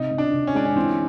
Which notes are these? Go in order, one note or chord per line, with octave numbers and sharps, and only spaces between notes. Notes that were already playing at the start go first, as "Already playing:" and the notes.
Already playing: C3 D#4
C3
D4
C3
C#4
G#3 D4
C#4
E3 C4